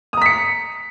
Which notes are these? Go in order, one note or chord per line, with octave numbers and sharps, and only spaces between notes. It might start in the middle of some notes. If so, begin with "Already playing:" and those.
A#5 D#6 B6 C#7